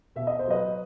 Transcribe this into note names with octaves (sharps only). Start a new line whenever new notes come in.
B2 E5
D#5
C5
F#3 B4 D#5